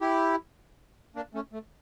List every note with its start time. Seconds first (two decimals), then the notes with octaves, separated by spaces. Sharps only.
0.01 E4 G4
1.16 A#3 D4
1.34 A3 C#4
1.53 A3